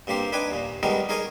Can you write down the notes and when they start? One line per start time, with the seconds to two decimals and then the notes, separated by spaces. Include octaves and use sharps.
0.07 G2 C3 A#3 G4 C5
0.32 D4 D#4 B4 G5 G#5
0.51 D#2 A#2
0.83 D#3 G3 G#3 B3 D#4 A#4
1.09 D#4 G#4 A#4 C#5 D#5